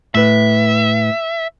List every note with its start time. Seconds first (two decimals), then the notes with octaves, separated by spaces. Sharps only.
0.15 A2 B4 E5